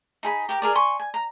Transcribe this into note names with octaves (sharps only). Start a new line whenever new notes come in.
D#4 G#4 B5
G4 A#4 D6
G#4 A#4 D5
G#5 C6 C#6
G#5
A#5